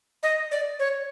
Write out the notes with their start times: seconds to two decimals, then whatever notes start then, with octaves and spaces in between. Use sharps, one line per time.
0.23 D#5
0.52 D5
0.79 C#5